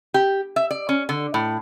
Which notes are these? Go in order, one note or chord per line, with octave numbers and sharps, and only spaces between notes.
G4
E5
D5
C#4
D3
A2